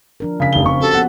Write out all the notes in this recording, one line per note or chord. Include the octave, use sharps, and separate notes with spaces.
F3 D4 A#4
C#3 B6
F1 G7
C4 C#6
C#4 F#4 G4 A4
F3 B3 F#5